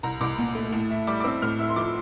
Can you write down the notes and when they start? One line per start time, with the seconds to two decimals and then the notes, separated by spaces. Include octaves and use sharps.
0.03 C2 A#5
0.21 C2 D6
0.38 A#2
0.55 A3
0.72 A2
0.90 E4
1.07 G3 D6
1.20 D6
1.24 C4 E6
1.42 A2 F6
1.59 E4 E6
1.69 C6
1.76 F3 D6